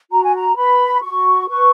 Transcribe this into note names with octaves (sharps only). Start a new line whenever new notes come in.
F#4 A#5
G#5
A#5
B4 B5
F#4 C#6
B4 C#6